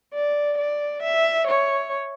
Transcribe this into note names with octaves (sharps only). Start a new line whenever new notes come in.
D5
D5
E5
C#5